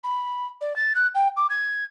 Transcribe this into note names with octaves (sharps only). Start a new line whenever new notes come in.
B5
D5
A6
F#6
G5
D6
G#6